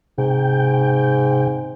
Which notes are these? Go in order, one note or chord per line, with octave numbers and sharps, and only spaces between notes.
G#2 C3 G5